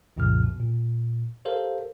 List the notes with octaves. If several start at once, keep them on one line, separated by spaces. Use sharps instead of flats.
C2 F#2 A#2 C#3 F3 F6
B2
A#2
G4 A4 A#4 C5 F5